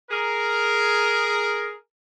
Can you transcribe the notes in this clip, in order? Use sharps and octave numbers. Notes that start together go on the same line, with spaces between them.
G#4 A#4